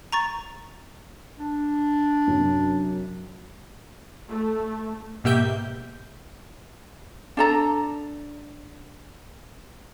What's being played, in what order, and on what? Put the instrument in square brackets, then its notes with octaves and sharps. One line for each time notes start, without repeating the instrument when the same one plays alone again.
[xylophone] A#5 C#6 A6
[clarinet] D4
[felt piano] F#2 C3 F#3
[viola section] A3
[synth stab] G#2 B2 A#3 G4 E5 G6
[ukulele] D4 A4 A#5